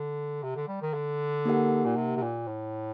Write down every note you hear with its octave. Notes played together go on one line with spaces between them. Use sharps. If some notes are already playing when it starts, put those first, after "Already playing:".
Already playing: D3
C3
D3
G3
D#3
D3
A#3 D#4 G4 A#4 F#5
A#2
C3
C3
A#2
A2